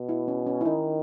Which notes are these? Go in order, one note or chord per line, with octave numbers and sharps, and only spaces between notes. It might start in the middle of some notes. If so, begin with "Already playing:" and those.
Already playing: B2
E4
C#4
C#4
E4
D#3 D#4